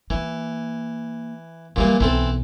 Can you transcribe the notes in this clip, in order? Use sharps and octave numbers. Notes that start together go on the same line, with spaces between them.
E3 A#3
A#2 E3 F#3 G3 A#3
B1 E3 C4 A4